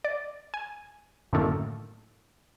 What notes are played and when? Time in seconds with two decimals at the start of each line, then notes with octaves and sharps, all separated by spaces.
0.05 D5
0.54 G#5
1.33 F#2 A2 D3 D#3 A3 A#3